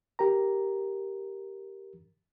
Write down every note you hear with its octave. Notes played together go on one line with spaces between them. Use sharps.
G4 A#4 A#5